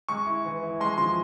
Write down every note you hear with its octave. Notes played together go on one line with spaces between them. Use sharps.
G#3 C#6
E4
E3
E4
G#3 C6
F3 C6